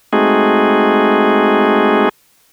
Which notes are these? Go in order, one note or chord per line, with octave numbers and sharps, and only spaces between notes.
G#3 A3 C4 D#4 F#4 G#4